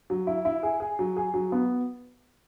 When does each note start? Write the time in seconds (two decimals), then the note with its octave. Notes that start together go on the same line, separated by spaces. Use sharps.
0.10 F#3
0.27 E4
0.45 E4
0.63 G#4
0.80 G#4
0.99 F#3
1.17 G#4
1.34 F#3
1.52 B3